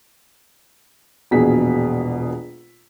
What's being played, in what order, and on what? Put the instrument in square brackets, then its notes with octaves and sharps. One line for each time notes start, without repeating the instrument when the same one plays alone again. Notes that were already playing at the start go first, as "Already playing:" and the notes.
[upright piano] E1 A#1 B2 G#4 B6